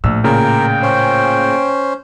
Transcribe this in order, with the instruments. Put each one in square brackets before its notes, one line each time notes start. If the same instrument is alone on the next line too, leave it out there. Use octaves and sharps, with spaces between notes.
[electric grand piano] A#1 E6 [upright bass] A2
[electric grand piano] A#2 C#3 [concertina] A#4 [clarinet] G5
[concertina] C#4 C5